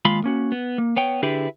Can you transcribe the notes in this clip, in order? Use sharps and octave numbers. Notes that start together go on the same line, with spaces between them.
D#2 G#3 F4 F5 B5 C6
A#3 C#4 F#4
B3
A#3
B3 C#5 G5
D3 D4 E4 G4 G#4 B4